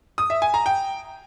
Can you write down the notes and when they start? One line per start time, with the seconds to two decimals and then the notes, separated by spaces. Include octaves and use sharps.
0.18 D#6
0.30 E5
0.42 G#5
0.54 A#5
0.66 G5